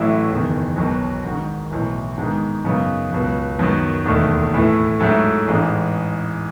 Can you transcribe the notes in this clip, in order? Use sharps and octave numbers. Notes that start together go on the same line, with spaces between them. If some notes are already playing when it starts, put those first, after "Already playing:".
Already playing: A1 A2 F#3 A3 E4
F#1 E2 D#3
B1 B2 F#3
G#1 G#2 D#3
B1 A2 E3
G#2 D#3 G#3 B3
F#2 C#3 F#3 B3 D#4
C#2 B2 F#3
F#2 D#3 F#3 B3
E1 D#2 D#3 A3 D#4
A2 E3 A3 E4
G#2 F#3 A3 E4 A4
A1 G#2 E3 G#3